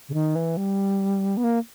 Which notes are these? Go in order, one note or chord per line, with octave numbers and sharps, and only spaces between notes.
C#3
D#3
E3
G3
B3
A#3